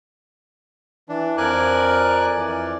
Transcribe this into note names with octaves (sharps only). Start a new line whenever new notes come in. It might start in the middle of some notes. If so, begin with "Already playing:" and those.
E3 D4
F2 F3 A#4 D5 G#5 F#6
F2 E3 D5